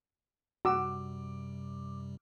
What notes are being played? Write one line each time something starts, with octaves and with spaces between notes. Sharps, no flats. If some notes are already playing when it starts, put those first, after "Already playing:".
F#2 C3 G3 F#4 D6 E6